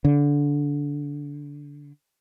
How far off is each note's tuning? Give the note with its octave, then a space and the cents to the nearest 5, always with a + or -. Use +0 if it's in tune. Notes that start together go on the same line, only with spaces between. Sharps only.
D3 -20